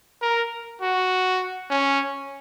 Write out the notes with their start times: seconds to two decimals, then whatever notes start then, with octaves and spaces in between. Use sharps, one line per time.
0.22 A#4
0.81 F#4
1.70 C#4